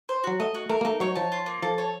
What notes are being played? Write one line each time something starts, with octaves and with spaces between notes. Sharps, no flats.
C5
F#3 F#4
A3 D#5
F#4
A3 A#4
A#3
A3 D#4
F#3 C#5
F3 A5
F4
A#3
F3 A4
C#5